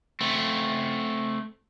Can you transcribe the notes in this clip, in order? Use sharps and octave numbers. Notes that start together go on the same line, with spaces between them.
A3 C4